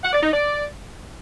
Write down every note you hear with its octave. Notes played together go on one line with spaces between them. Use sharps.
F#5
D5
D#4
D5